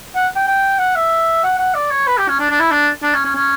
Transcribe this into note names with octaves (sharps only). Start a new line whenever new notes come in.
F#5
G5
G5
F#5
E5
F#5
F#5
D5
C#5
B4
G4
C#4
D4
D4
E4
D4
D4
C#4
C#4
C#4